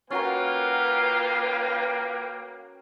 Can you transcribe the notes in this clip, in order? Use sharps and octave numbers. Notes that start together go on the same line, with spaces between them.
A#3 C#4 D#4 F4 F#4 A#4 B4 G5